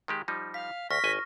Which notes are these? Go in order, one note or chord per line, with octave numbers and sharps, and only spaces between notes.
D#3 G#3 G4
F3 G3 D#4
F5 B6
D2 C#6 F6 A#6 B6
G#1 D#5 G#5